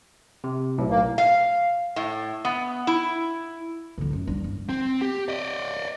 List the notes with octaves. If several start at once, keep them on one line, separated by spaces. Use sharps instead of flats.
C3
B1 A2
A#3
F5
A2
B3
E4
D3 F3
F#2 F#3
G3 D4
G2
C4
G4
D5 D#5